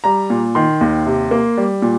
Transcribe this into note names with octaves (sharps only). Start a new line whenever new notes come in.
G3 A#5
A#2
D#3 C6
D#2
C3
A#3
G3
A#2